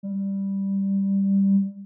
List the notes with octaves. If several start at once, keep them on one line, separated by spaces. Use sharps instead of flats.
G3